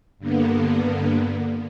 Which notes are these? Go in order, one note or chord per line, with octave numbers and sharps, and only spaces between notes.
G2 D3 A#3 B3